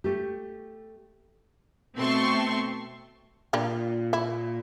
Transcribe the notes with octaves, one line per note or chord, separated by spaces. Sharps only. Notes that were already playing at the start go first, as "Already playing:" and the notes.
A3 G4
B2 A3 C4 A5 C6 C#6
A#2 A#3 D4 G4
E4